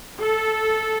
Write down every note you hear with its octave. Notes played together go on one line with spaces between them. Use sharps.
A4